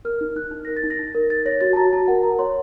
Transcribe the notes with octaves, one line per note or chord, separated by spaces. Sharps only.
A#4 F6
D#4
D#4 F#6
D#4
A#4 A#6
A6
D#4
A#6
D#4
A#4
A#4 A6
C#5 A#6
F#4 A6
A5
F#4 A#5
F#4 A5
A#4 F#5
A#4 A#5
C#5 C6